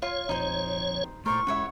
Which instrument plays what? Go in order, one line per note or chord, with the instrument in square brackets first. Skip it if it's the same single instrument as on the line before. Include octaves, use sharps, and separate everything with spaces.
[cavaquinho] F4 [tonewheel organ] C#5
[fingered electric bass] A#1 F2 F3 [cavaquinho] D#4 C5
[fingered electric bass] A#2 A3 [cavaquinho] A#4 C5 D5 [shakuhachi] C#6
[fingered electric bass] E1 G#3 C#4 [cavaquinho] E4 C#5 F#5